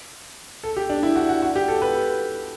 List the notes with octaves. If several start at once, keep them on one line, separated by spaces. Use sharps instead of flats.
A4
G4
D4
E4
F#4
F#4
F#4
G4
A4
B4